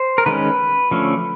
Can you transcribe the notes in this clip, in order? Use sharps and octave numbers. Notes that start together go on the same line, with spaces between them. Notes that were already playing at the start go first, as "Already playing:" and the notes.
Already playing: C5
A#4
D#3 G#3 C#4 B4
D3 F3 A3 C#4